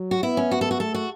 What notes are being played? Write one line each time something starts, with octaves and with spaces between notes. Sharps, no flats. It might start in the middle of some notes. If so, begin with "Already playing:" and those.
Already playing: F#3
F#4
B3 E4
C#4
F#4
A4
F#4
A3 A4
F#4